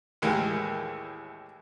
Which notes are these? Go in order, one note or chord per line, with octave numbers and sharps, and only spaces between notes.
D#2 A2 E3 G#3 A#3